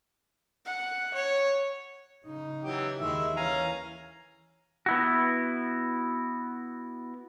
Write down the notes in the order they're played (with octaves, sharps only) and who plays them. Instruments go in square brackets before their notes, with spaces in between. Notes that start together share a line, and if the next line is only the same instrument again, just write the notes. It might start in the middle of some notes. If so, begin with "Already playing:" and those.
[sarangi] F#5
C#5
[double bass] C#3 D#4
[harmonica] E3 F#3 G4
[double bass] D#2 D#3 [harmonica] G#3 E4 E5
[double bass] E3 [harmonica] C#4 [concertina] F5 G#5 A#5
[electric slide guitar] B3 E4 F#4